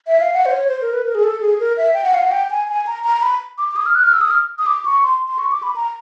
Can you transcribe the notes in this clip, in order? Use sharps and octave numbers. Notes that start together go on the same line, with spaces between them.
E5
F5
F#5
C5
C#5
C5
A#4
B4
A#4
G#4
A4
G#4
A#4
E5
G5
F#5
F5
F#5
G5
G#5
G#5
A#5
A#5
A#5
B5
D6
D6
D#6
F6
F#6
F6
E6
D#6
F6
D#6
D6
C#6
C6
C6
C#6
D6
B5
A#5